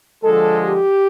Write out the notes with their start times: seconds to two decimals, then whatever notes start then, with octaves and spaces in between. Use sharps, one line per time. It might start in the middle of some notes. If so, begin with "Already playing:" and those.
0.23 D3 F3 G#3 A4
0.62 G4